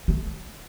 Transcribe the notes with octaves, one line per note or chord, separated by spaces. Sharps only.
A3